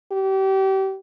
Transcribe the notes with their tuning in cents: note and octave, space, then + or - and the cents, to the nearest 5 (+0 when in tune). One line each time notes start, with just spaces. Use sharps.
G4 -30